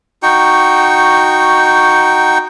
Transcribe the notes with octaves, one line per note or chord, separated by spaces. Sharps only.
D#4 F#4 G5 C#6